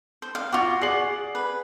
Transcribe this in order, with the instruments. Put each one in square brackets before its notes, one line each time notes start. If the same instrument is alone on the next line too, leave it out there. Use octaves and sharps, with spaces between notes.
[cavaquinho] C5
F5
[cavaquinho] F4 F#4 [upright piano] C#6 D6
[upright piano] G#4 C7 F#7 [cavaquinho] D5 F#5
[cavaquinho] B4